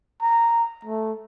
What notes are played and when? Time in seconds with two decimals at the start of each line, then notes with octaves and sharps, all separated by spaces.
0.22 A#5
0.85 A3